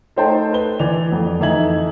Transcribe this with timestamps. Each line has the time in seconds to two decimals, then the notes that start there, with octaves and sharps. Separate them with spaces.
0.16 A3 D#4 C5 G5 A5
0.53 B4 G7
0.79 E3 D5 F7
1.12 F2
1.40 F2 E3 D#4 E5 G#6 F#7